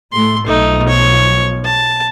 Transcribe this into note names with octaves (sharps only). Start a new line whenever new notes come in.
A2 A3 C6
B1 B2 F3 A3 D#4
C#5
A5